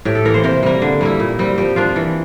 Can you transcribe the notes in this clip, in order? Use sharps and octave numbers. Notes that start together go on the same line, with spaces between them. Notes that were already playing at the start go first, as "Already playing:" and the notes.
A2 G4
A4
E3 A#3 A#4
C5
C3 A#4
G3 A#3
D3
G3 A#3 E4
A#2
G3 C4
F3 G4
A#3 D4 F4
E3